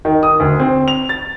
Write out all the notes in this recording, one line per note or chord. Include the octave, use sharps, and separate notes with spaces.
D#3
D#6
D2
C4
F7
A6